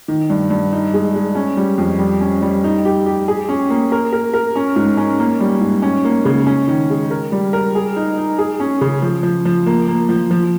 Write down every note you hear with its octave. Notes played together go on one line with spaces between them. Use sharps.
D#3
G2
G2
D#4
G#3
G#3
C#4
G3
F2
G3
C#4
G3
D#4
G4
G4
G#4
C#4
A#3
A#4
A#4
A#4
C#4
G#2
C#4
A#3
G3
G#2
C#4
A#3
C#3
C#4
D#3
G#3
A#4
G3
A#4
G#4
D#4
D#4
G#4
C#4
C#3
F3
F3
F3
A#3
A#3
F3
F3